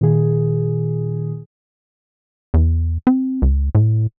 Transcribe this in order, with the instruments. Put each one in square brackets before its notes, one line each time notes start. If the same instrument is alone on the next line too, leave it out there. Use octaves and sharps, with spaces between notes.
[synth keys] A#2 D#3 G#4
[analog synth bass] E2
C4
C#2
A2